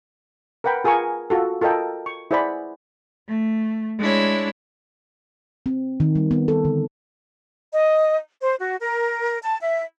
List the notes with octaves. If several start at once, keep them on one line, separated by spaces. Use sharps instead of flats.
A#4 B4 F#5 G5 B5
F4 G#4 A#4 G#5 C#6
F4 F#4 A4
F4 A4 A#4 D#5 G5 A5
C#6
E4 G#4 C5 D5 F#5 B5
A3
G#3 D4 E4 C#5
C4
D#3
G3
B3
A4
D3
D#5
C5
F#4
A#4
A5
E5